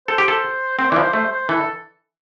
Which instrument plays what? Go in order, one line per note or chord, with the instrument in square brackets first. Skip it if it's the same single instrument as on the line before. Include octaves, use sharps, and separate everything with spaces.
[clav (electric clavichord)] A4 [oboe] C5
[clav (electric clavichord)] G4
A4
[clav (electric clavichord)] C4 [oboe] C5
[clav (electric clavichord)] E3 [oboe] D5
[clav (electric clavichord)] F3
[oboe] C5
[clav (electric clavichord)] A3 [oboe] C5
[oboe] C5
[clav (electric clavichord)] E3 [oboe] A4